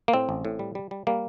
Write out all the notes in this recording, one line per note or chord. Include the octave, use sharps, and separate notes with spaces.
A#3
A2 C4
A1
A2
G3
G3
G3
G3 A#3